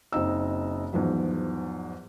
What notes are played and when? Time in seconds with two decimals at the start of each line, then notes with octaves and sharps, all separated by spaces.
0.12 F#1 C4 D#4 E6
0.93 E2 G#2 F3 F#3